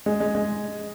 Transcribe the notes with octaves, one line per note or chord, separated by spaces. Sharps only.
G#3
G#3
G#3